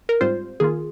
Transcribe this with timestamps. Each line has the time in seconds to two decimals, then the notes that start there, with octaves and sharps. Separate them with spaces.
0.09 A#4
0.21 G#2 G3 C4 F4 C5
0.60 D#3 A#3 F4 G#4